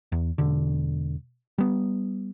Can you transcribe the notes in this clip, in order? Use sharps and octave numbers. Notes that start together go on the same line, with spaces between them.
E2
E1 D3
G3 B3